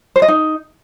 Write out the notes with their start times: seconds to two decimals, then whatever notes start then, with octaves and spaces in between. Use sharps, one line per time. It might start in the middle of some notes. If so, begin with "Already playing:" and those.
0.16 C5
0.22 D#5
0.28 D#4